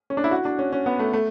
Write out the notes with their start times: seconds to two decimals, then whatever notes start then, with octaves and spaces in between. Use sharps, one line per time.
0.10 C#4
0.17 D4
0.24 E4
0.31 F#4
0.45 D4
0.59 C#4
0.73 C#4
0.86 B3
0.99 A3
1.13 A3